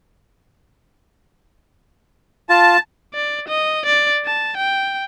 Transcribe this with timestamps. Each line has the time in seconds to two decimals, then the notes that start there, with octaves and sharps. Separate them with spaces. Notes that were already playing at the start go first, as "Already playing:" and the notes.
2.49 F4 A5
3.14 D5
3.48 D#5
3.86 D5
4.26 A5
4.57 G5